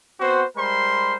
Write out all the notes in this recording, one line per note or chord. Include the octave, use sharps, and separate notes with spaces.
B3 C4 F#4 C5
G3 G#3 A#4 C5 B5 C6